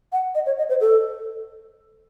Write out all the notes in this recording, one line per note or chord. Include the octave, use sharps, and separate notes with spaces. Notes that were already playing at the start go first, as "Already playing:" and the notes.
F#5
D#5
C#5
D#5
C5
A4